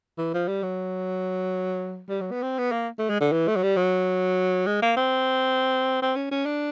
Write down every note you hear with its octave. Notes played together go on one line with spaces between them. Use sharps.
E3
F3
G3
F#3
G3
F#3
B3
C4
B3
A#3
A3
G#3
D3
E3
A3
F#3
G3
F#3
G#3
A#3
C4
C4
C#4
C#4
D4